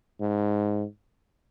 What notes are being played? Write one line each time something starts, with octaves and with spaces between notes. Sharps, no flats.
G#2